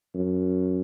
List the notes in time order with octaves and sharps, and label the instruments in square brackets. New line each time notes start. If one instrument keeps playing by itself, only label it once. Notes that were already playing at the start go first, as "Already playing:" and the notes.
[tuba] F#2